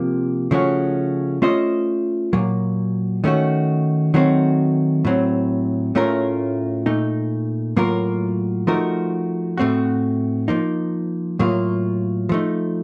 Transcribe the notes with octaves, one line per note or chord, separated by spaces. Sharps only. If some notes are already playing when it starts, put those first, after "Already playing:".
Already playing: C3 F3 A#3
C#3 F3 A3 C#4 F#4
A3 C#4 F4 C5 D#5
A#2 F#3 A#3
D#3 A3 C#4 F#4
D#3 F#3 A3 C4 F#4
A2 F#3 C4
A2 A3 C#4 F4 A#4
A#2 A3 D#4
A2 F#3 A#3 F4 A#4
F3 A3 D#4 F#4 A#4
A2 A3 C4 F#4
F3 A#3 D#4
A2 F#3 A#3 F4
F3 A3 D#4